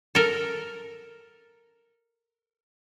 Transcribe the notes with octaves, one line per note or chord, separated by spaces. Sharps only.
A4 A#4